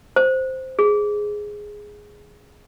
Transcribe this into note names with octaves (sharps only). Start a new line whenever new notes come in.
C5
G#4